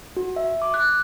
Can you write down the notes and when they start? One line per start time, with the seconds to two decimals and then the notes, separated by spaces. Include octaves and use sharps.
0.17 F#4
0.36 E5
0.62 D6
0.74 F#6